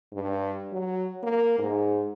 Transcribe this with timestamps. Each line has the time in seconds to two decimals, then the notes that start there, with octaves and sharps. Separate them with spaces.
0.13 G2
0.72 F#3
1.23 A#3
1.59 G#2